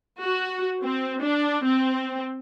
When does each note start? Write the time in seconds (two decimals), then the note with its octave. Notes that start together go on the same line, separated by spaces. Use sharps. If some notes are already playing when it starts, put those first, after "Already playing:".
0.21 F#4
0.83 C4
1.21 D4
1.64 C4